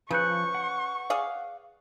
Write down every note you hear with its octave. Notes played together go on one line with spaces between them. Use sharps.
C#3 F3 B4 C#6 F#6 G6 C#7
F#5
G#4 D5 F5